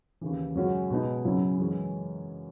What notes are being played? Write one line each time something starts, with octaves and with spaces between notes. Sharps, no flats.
D#2 C#3 E3
F#2 C#3 G#3 C#4 F#4
B2 G#3 B3 D#4
F#2 C#3 F#3 C#4 E4
F#2 E3 G#3 C#4